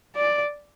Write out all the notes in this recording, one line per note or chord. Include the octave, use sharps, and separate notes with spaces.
D5